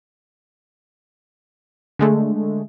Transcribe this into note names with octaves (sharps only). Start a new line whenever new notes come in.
D3 G#3 A3